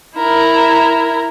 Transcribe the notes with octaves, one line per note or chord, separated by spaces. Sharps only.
E4 A#4